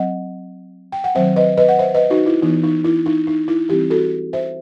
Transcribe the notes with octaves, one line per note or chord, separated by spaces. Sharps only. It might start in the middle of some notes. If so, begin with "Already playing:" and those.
Already playing: F#3 C4 D#5 F#5
G5
F#5
D#3 F#3 C4 C5 E5
B4 D#5
B4 D#5
F#5
C5 E5
B4 D#5
D#4 F#4
E4
E3 B3 D#4
D#4
E4
D#4
D#4
E4
E3 G3 C4 E4 G4
F#4 A4
C5 E5